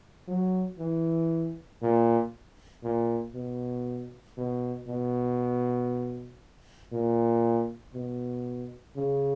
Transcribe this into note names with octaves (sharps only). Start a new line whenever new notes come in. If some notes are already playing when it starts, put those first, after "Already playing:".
F#3
E3
A#2
A#2
B2
B2
B2
A#2
B2
C#3